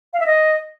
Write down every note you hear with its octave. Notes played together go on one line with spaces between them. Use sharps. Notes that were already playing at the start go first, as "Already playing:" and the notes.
F5
E5
D#5